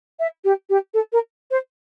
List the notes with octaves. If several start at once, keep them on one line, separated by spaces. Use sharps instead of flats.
E5
G4
G4
A4
A#4
C5